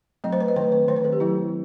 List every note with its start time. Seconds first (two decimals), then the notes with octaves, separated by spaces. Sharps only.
0.24 F#3 A3 C4 D#5
0.32 C5
0.41 B4
0.48 D#5
0.56 D#3 A3 C4 B4
0.72 B4
0.88 D#3 A3 C4 C5
0.97 B4
1.04 A4
1.13 G4
1.20 F#3 A3 C4 E4